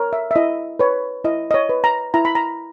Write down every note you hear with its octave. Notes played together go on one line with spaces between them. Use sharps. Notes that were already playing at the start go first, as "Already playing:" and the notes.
Already playing: A#4 C#5
E5
E5
E4 D#5
B4 C#5
E4 D#5
D#5
C#5
B4
A#5
E4 A#5
B5
A#5